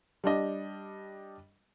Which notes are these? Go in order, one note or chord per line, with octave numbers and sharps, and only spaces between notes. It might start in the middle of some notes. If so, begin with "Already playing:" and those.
G3 D4 D#5